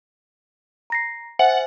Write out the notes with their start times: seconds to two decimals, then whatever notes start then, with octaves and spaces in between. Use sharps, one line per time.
0.90 A#5 A#6 C7
1.39 C5 E5 F#5 G#5